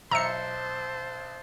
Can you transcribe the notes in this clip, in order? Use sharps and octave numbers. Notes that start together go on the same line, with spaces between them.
B1 C5 E5 A5 A#5 E6 C#7